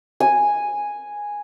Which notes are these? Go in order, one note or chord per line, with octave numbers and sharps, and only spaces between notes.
G#5